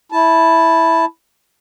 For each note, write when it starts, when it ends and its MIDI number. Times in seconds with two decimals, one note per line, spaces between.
0.12 1.05 64
0.12 1.05 81